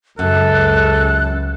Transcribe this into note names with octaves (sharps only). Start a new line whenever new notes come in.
C#2 F#2 A4 F#6